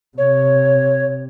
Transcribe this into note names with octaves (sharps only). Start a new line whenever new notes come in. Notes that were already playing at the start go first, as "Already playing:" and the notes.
C3 C#5